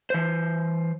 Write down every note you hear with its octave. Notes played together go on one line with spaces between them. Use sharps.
E3 C5